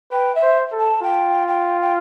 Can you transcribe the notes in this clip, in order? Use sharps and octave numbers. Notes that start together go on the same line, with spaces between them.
B4 G5
E5
C5
A4
A5
F4 G5
G5
G5